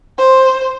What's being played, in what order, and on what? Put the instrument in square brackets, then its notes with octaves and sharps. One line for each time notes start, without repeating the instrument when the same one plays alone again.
[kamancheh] C5